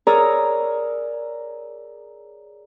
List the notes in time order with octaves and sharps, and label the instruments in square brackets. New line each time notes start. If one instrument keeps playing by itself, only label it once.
[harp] G#4 A#4 C#5 D5 A#5 E6